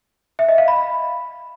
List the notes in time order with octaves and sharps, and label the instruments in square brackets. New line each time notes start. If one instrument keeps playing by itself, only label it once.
[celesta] E5
D#5
F5
B5